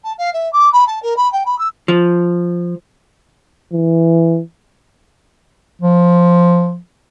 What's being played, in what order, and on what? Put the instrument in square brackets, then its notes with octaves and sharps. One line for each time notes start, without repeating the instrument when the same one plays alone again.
[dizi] A5
F5
E5
D6
B5
A5
A#4
B5
G5
B5
E6
[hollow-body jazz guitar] F3
[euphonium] E3
[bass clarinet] F3